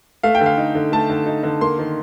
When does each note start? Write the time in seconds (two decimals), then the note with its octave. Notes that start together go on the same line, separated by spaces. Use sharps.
0.23 A3 F5
0.35 G5
0.41 D3 F5
0.57 D#4
0.75 D3
0.92 A3 A5
1.10 D3
1.26 D#4
1.43 D3
1.61 A#3 C6
1.79 D#3